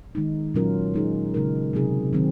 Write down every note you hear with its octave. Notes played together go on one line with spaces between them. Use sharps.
D#3 G#3 D#4
A#2 F#3 C#4 F4 A#4
G#3 D#4 G#4
C#3 G#3 D#4 A#4
C3 F#3 C4 D#4 G#4
D#3 F#3 C4